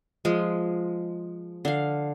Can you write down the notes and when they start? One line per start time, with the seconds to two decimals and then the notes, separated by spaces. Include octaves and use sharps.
0.25 F3 G#3
1.65 D3 F5